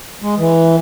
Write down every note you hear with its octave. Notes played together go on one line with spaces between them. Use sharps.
G#3
E3